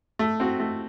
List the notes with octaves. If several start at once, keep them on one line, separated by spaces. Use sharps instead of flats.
A3
C4 F#4
A3